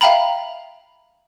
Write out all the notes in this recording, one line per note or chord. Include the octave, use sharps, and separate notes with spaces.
E5 F5 G5 A#5 B5